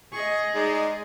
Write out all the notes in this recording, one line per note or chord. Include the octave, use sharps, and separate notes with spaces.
G#4 D#5 C#6
G#3 D#4 D5